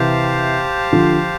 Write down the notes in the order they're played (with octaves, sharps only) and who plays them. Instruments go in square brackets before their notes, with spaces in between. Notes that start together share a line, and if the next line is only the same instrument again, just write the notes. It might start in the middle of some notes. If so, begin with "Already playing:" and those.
Already playing: [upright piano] C3 E3 [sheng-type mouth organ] G4 C5 F5 A5
[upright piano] D3 F3